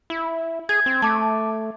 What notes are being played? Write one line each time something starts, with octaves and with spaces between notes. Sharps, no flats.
E4
G#4 G#6
C4
A3 A5 D6